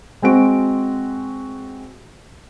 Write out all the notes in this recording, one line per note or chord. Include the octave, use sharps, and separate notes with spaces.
G#3 C4 F#4 D7